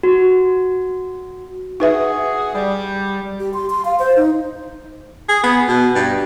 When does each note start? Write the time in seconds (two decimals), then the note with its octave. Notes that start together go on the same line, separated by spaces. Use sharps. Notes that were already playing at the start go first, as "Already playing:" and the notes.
0.03 F#4
1.80 D#4 F#4 G#4 B4 E5
2.54 G3
3.40 G4
3.54 C6
3.70 C6
3.85 F5
3.99 C5
4.17 D#4
5.29 G#4
5.43 B3
5.68 B2
5.95 G2